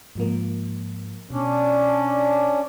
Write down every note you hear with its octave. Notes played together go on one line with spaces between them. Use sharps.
G#2 F3 A#3
B2 C#4 D4